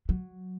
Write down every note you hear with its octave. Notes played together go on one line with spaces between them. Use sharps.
F#3